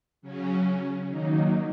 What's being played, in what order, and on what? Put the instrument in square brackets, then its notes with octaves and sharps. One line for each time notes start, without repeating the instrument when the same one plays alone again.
[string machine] C#3 F#3 C#4
D#3 F#3 A#3 D#4